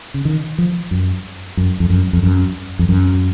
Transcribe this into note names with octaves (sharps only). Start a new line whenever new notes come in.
C#3
D#3
F3
F#2
F#2
F2
F#2
F2
F#2
F2
F#2